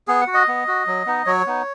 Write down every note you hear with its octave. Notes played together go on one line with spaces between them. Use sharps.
B3 G#4
F#5
F#4
D#5
B3
F#4
F#3
B3 D#4
F#3 C#5
B3 D#4